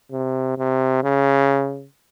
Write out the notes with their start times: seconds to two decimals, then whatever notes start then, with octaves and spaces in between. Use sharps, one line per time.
0.12 C3
0.58 C3
1.04 C#3